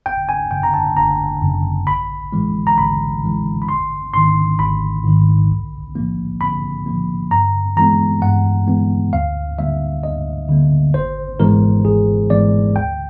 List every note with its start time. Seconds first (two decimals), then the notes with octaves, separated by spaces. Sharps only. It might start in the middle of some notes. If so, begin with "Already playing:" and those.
0.06 G1 G5
0.29 G#5
0.51 F#2 C#3 G5
0.63 A#5
0.74 A5
0.97 G1 A#5
1.42 F#2 C#3
1.87 A1 B5
2.32 A2 E3 G#3
2.67 A#5
2.78 A1 B5
3.23 A2 E3 G#3
3.62 B5
3.68 G#1 C6
4.14 G#2 D#3 C6
4.59 G#1 B5
5.05 G#2 D#3
5.50 B1
5.95 A2 F3 A#3
6.41 B1 B5
6.86 A2 F3 A#3
7.31 G2 A#5
7.77 E3 G#3 B3 A#5
8.22 G2 F#5
8.67 E3 G#3 B3
9.13 D2 F5
9.58 D3 G3 A#3 E5
10.03 D2 D#5
10.49 D3 G3 A#3
10.94 G#1 C5
11.40 G#2 E3 G#3 B3 A#4
11.84 G#1 G#4
12.30 G#2 E3 G#3 B3 D5
12.75 D2 G5